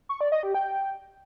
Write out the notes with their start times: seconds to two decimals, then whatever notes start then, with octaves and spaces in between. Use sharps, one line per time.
0.09 C#6
0.21 D5
0.32 D#5
0.43 G4
0.54 G5